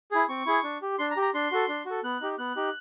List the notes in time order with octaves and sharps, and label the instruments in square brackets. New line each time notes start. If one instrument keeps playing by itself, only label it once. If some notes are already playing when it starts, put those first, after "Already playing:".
[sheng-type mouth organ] E4 G#4
C4 C#6
E4 G#4
D4
G4
D4 C6
A#5
G4
A#5
D4 C6
F#4 A4
D4
F#4 A4
B3 F#6
D#4 G4
B3 F#6
D#4 G4